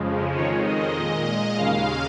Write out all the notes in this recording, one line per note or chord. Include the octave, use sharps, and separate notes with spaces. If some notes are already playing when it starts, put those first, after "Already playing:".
Already playing: F2 C#3 F3 G#3
F2 D#3 G#3 C#5
D#5
A#2 G#3 D#5
D#2 C#3 G#3 F5